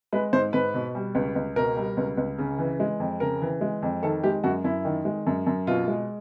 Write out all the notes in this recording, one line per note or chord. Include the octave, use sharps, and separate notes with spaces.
G#3 B4
G#2 C5
G#2 B4
B2
G3
C#2
C#2
B2 A#4
G3
C#2
C#2
C#3
E3
G#3
F2
C#3 A#4
E3
G#3
F2
D#3 A4
G#3 G4
F#2 F#4
F#2 E4
D#3
G#3
F#2
F#2
B2 F4
G#3